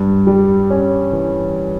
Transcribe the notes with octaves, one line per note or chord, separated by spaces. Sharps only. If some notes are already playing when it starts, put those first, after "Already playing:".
Already playing: G2
G3
C#4
E3